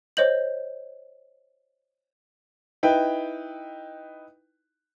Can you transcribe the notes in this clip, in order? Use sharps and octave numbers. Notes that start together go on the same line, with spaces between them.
C5 C#5 D#5 G6 F#7
D#4 E4 B4 G5